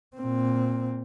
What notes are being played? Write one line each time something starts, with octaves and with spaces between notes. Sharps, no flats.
A#2 C4